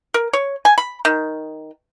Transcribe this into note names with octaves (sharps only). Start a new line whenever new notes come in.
A#4
C#5
G#5
B5
D#3